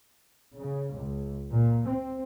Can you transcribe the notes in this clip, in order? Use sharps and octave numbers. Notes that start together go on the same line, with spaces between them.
C#3
C#2
A#2
C4